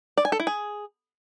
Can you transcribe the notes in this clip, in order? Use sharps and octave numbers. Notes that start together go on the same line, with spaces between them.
D5
G#5
A4
E4
G#4